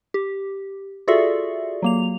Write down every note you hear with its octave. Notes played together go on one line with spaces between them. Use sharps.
G4
F4 F#4 G#4 A4 D5 E5
F#3 A#3 F7